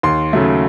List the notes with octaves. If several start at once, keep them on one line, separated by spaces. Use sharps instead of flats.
D#2 C6
C#3 F#3 A3